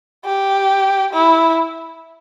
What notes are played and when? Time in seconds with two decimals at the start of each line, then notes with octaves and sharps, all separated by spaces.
0.25 G4
1.13 E4